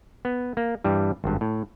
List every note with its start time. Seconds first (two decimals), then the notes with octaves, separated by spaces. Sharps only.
0.25 B3
0.57 A#3
0.84 G2 E3 G3
1.24 G#1 G2
1.41 A2